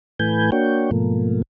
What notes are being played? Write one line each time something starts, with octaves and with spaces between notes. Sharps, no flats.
A2 E3 A3 B4 G#5 G6
A#3 D4 F#4 C#5 G5
G#2 B2 F3 A3 A#3